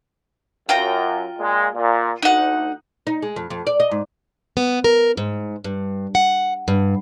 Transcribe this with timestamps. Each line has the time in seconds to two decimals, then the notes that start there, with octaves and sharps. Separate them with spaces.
0.69 F#2 F4 G5 A#5
1.39 A#2 G#3
1.75 A#2
2.22 D2 D#4 F#5
3.07 D#4
3.22 G#3
3.36 F2
3.50 F2
3.67 D5
3.80 D#5
3.91 G#2
4.57 B3
4.84 A#4
5.17 G#2
5.64 G2
6.15 F#5
6.68 G2